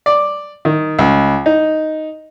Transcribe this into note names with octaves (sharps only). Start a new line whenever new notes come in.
D5
D#3
C#2
D#4